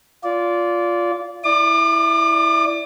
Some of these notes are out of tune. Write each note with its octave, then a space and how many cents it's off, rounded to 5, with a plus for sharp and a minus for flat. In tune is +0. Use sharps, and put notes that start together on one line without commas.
F4 +0 D5 -20
E4 +0 D5 +0 D6 +40